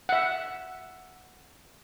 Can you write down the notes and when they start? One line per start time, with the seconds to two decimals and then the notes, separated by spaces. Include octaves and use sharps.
0.09 E5 F#5